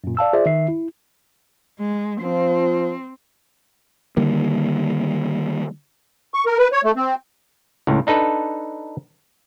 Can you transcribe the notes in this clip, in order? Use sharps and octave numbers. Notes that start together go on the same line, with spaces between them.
F#2 A#2
D5 F5 A5 E6
F4 G#4 C5 D5 E5
D#3 E5 C7
E4
G#3
F3 C4
D3 D#3 G3 A#3
C#6
A#4
B4
C#5
A3
C4
C#2 A2
D4 D#4 A4 B4